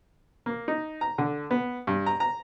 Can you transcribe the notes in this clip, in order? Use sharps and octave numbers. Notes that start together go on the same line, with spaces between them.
A#3
D#4
A#5
D3
B3
G2
A#5
A#5